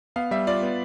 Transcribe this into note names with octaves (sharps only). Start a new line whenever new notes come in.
B3 F5
G3 E5
F4 D5
B3